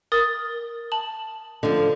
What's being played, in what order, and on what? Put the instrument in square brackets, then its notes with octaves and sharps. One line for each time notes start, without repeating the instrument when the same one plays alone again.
[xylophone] A#4 D#6 A6
A5 F#7
[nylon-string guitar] D3 F3